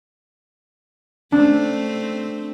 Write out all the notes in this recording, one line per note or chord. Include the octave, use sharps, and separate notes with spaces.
A3 C4 D4